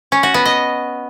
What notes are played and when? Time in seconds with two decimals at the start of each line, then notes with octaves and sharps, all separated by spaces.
0.12 C#4
0.23 F#4
0.34 B3
0.45 D#5